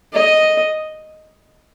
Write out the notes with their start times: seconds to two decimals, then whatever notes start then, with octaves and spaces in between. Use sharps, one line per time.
0.14 D#5